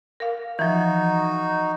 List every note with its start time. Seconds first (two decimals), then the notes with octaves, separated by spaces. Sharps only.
0.20 A#4 F5
0.59 E3 F3 D#4 F#4